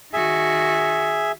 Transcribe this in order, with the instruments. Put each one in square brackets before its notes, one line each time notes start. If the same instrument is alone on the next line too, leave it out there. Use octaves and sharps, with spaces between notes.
[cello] D#3 F#4 [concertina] G#4 E5